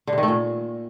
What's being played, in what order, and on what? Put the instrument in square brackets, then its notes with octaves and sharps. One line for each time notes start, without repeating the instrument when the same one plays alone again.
[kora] D3
C3
D#3
A3
A#2